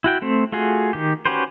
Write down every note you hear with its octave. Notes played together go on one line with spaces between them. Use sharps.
E4 F#4 G5
A3 C4
A3 F4 F#4 G#4
D#3 G4
C#4 F#4 G4 B4 C5